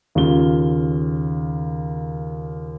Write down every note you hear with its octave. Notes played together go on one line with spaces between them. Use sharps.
D#2 C#3 F4 G7